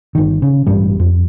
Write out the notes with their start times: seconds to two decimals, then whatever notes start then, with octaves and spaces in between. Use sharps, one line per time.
0.15 G1 D#3
0.42 C#3
0.67 A1 G2 G3
1.00 F2